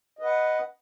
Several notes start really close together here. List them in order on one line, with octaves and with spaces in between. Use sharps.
D#5 B4 F#5